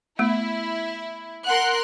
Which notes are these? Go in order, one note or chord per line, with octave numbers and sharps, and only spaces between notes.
A3 B3 E4
A#4 F#5 C6 F#6